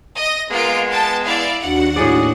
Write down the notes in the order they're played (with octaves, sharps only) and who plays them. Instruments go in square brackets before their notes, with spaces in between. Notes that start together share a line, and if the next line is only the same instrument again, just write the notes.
[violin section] D#5 A#6
[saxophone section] G#3 B3 [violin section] A#3 F4 D7
[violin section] G5 A5
E4 D5 F5
[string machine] D#2 D4 F#4 [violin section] F#5
[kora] A2 D5 [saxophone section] G#4